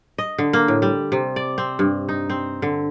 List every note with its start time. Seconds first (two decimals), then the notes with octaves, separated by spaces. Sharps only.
0.18 D#5
0.38 D3
0.53 A#3
0.68 A2
0.82 G3
1.12 C3
1.36 D5
1.58 C4
1.79 G2
2.09 D#4
2.30 C4
2.62 D3